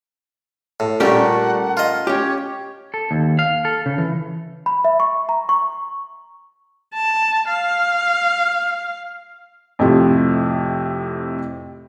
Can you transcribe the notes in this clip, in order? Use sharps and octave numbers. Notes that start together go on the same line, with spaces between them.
A2
A#2 G3 A3 C#4 G4 A#4 F#5
F4 D#5
C#4 G4 C#5
A4
D#2
F5
A4
C#3
E3
B5
E5
C#6
A#5
C#6
A5
F5
F2 A2 C3 F4